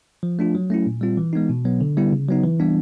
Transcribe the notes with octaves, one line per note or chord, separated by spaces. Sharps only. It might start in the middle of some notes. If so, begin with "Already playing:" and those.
F3
A3 D4 F4
F#3
A3 C#4 E4
A#2
G3 C4 F4
E3
G#3 B3 D#4
B2
F#3 B3
D3
G3 B3 E4
C#3
F#3 B3 D#4
E3
G3 B3 D4